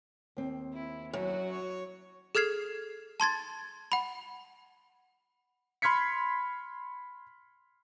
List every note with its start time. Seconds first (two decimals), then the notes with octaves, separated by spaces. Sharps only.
0.37 D#2 C4
0.73 E4
1.13 F#2 F#3 F#4
1.51 C#5
2.35 G#4 A4 F6 G#6 C7
3.20 A5 C6 G#6 A6
3.92 F#5 B5
5.82 B5 C6 F6 G#6 B6 C#7